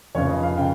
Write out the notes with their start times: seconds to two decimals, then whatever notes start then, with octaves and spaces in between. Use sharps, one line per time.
0.15 F1 F2 C#3 C#5
0.29 D#5
0.43 F5
0.58 C#3 G5